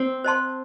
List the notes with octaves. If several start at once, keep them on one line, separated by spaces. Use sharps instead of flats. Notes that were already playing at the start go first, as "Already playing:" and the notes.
Already playing: C4
C5 D#5 A5 C6